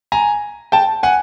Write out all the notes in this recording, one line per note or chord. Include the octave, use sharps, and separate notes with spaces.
G#5 A#5
G5 A5
F#5 G#5